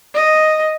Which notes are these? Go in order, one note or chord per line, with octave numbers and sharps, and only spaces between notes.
D#5